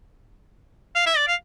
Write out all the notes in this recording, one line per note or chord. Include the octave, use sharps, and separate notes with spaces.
F5
E5
D5
F5